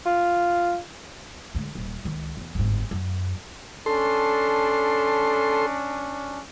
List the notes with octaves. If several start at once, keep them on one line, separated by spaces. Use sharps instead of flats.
F4
D3 G#3
D#1
C#2 D#3
E2
G1 G#2
F#2
C#4 D4 A4 C6